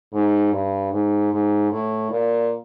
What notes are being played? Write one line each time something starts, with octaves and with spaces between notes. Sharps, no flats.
G#2
G2
G#2
G#2
A2
A#2